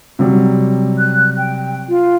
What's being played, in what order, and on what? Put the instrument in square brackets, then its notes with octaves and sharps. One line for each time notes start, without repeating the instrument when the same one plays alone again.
[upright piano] C3 F#3 G3
[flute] F#6
G5
F4